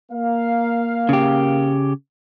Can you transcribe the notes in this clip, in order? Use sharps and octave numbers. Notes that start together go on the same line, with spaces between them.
A#3 F5
C#3 G4